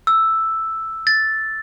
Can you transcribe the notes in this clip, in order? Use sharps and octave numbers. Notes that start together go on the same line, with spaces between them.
E6
A6